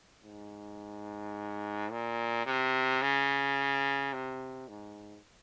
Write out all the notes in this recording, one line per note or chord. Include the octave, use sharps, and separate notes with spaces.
G#2
A#2
C3
C#3
C3
G#2